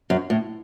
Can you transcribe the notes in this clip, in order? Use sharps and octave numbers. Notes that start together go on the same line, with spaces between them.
F#2
A2